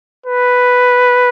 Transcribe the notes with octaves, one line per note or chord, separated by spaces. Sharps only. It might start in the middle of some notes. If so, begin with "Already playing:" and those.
B4